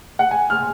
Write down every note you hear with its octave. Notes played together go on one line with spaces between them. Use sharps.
F#5
G#5
F6